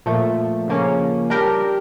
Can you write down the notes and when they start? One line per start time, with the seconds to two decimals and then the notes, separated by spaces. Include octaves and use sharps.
0.06 A#2 F3 A3
0.68 C#3 F3 A#3 C#4
1.30 G3 D4 G4 A#4